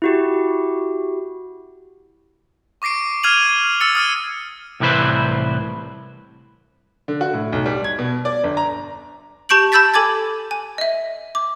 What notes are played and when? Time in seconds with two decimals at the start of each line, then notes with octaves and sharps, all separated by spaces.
0.02 E4 F#4 G4
2.82 C#6 D6 A#6 C7 D7
3.23 F6 G#6 C7 D#7 F7 F#7
3.81 E6 A6 C#7
3.95 D#6 F6 C#7 D#7
4.80 C2 A2 E3 B4 C5
7.08 D3
7.21 F#4
7.33 A2
7.52 B1
7.66 G3
7.84 G#6
7.99 B2
8.25 D5
8.44 G1
8.57 A#5
9.49 G4 A5 C#6 G6 D7 F#7
9.72 A5 B5 E6 G6 A6 B6
9.94 A4 G#5 D6 G#6 A6
10.51 G#5
10.78 D#5 E5
11.35 D6